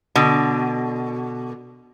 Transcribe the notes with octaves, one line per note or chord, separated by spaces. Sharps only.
B2 D3